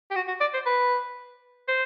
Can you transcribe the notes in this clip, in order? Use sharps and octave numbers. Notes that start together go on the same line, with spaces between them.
G4
F#4
F#4
D5
C5
B4
C5